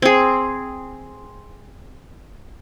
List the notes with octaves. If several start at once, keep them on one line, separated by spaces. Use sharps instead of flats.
C4 G#4